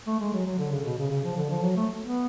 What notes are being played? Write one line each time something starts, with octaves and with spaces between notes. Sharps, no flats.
A3
G#3
F#3
F#3
D3
C#3
B2
C#3
C#3
F3
D3
F3
F#3
A3
B3